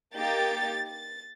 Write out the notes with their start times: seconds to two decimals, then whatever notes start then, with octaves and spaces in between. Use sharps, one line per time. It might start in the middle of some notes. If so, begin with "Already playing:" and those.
0.15 A#3 D#4 G4 A6
0.87 A6